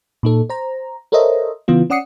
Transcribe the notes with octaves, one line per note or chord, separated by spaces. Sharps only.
A#2 D#4 A4
C5 A#5
A4 A#4 C5 C#5 D#5 E5
C#3 E3 B3 F4
C#4 D5 F#5 D#6 C7 C#7